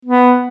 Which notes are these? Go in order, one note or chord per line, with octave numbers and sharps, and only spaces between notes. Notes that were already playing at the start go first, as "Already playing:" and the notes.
B3